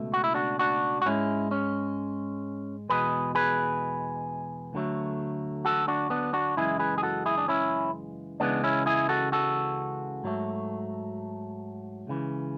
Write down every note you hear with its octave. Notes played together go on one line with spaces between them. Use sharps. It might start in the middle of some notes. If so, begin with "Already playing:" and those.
Already playing: C#2 B2 A3
F#4
E4
D4 F#4
D4 F#4
F#4
G#2 G#3 C#4 E4
C#4
E2 B2 G#3 G#4 B4
G#4 B4
D2 D3 F#3 A3
F#4 A4
D4 F#4
B3 D4
D4 F#4
F#2 C#3 E3 G#3 E4 G#4
G#4 B4
G#4
F#4 A4
E4 G#4
D4
C#4 E4
C#2 C#3 E3 G#3 B3 D4
C#4 E4
E4 G#4
F#4 A4
F#4 A4
G#2 F#3 A3
C#2 C#3 E3